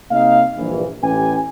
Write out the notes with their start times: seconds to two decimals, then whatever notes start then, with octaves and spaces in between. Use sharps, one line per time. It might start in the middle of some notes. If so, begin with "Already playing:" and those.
0.11 C3 A#3 D#4 D#5 F5
0.57 A#1 G2 E3
1.03 A1 C#4 G4 B4 G#5